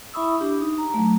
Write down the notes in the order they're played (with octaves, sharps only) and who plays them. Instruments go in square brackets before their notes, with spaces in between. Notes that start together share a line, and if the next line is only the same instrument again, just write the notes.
[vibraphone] E4 E5 B5 C#6 D#6 E6
D4 G4
D#4
A#5
F#3 A3